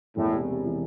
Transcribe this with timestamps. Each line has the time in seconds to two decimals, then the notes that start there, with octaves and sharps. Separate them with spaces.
0.17 E1 A2
0.33 C3
0.49 C3
0.65 E3